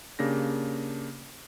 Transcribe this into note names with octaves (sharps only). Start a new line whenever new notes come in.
C#3 A#3 D4 G4 A#6